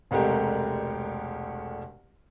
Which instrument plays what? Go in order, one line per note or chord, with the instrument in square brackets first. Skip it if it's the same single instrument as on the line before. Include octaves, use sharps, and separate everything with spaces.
[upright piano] E1 C2 G#3 A3 G4 A#4